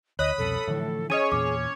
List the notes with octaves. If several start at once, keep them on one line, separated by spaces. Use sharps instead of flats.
D2 C#5 D#5 B5 D#6 F#6
C2 F2 B2 A4
A2 D3 E3 F3
C#4 G#4 C#5 D#5 D#6 D#7
E2 A#2 D6